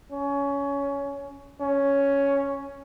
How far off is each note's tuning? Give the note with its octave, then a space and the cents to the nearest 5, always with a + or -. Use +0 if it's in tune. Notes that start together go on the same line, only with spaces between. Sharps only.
C#4 +20
C#4 +5